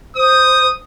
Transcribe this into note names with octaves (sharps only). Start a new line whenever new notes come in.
C5 D#6